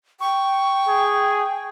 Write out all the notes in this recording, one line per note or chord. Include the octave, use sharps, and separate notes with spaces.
G5 C#6
G#4